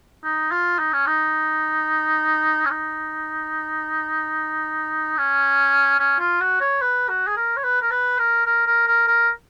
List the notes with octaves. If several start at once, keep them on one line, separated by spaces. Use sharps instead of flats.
D#4
F4
D#4
C#4
D#4
C#4
D#4
C#4
C#4
F4
F#4
C#5
B4
F#4
G#4
A#4
C#5
B4
A#4
B4
A#4
A#4
A#4
A#4
A#4